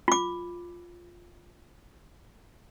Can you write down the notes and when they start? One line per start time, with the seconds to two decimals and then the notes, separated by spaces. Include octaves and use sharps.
0.08 F4 D6